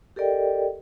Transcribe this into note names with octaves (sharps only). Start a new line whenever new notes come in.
G4 A4 A#4 D5 D#5 G5